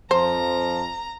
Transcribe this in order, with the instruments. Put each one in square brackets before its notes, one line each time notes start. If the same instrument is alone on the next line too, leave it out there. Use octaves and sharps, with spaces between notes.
[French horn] F2 [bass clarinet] F3 [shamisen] C5 [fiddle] A#5